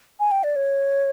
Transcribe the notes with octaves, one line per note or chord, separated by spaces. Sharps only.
G#5
G5
D5
C#5